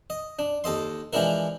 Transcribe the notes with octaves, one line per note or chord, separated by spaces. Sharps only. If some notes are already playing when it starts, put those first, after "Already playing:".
D#5
D4
D#2 A4 D#5 C6
E3 F3 G#3 D4 E4 A#4